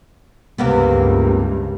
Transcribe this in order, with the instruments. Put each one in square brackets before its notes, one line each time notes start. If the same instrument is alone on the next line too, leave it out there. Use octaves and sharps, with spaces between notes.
[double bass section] C#2 G2 [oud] C3 A#3 B3